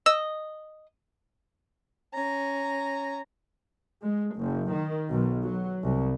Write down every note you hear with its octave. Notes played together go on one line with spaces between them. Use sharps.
D#5 E6
C#4 A#5
G#3
F#1
D#3
B1
F#3
C2